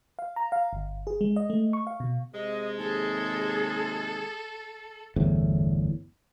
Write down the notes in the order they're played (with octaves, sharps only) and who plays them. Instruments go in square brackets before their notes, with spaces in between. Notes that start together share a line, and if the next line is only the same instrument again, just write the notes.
[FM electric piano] F5
A#5
F5
G1
G#4
G#3
D#5
A3
C#6
F5
B2
[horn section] C3 G#3 [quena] D#5
[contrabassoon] D#2 [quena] G#4 [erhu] A4
[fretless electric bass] G1 E2 A2